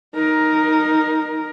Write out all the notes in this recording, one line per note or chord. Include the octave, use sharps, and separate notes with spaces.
D#4 A#4